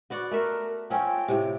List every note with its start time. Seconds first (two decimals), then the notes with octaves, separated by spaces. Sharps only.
0.10 B3 F#4 D5
0.31 A3 A#4 E5
0.90 F3 C4 C#4 G5
1.28 A2 C3